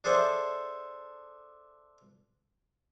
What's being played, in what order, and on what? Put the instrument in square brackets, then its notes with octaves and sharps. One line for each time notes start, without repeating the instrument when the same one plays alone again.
[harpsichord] D4 G#4 A4 C5 D5 E5